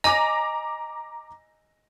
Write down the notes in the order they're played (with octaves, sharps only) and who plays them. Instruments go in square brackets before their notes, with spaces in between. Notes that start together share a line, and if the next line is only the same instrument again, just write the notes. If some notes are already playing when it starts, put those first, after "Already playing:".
[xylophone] D#5 G#5 [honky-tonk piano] A#5 D6 A#6